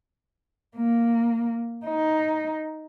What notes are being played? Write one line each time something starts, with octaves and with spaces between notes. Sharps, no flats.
A#3
D#4